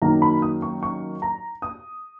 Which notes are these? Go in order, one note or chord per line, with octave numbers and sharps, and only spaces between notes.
F#2 D#3 F#3 A#3 D#4 A#5
B5
D#6
C#6
C#6
A#5
D#6